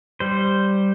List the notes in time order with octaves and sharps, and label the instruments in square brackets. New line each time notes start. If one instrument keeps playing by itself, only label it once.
[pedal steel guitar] G3 C5